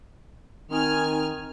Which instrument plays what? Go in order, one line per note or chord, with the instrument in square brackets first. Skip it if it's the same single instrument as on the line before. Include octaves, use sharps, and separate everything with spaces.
[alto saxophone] D#3 [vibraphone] C4 D#4 [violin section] G#5 F6